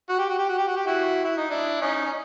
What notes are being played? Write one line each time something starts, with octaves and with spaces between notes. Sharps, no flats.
F#4
G4
F#4
G4
F#4
G4
F#4
G4
E4 F#4
E4
D#4
D4 E4
C#4 D#4
C#4